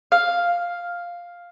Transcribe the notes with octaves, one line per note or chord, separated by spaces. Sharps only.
F5